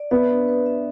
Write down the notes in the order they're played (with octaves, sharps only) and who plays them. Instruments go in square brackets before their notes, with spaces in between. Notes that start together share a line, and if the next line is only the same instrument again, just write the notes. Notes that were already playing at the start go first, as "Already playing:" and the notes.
Already playing: [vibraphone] D5
[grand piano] B3 [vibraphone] E5
[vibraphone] D4
B4
E5